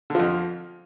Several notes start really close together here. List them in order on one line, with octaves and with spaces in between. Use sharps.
D3 F3 F2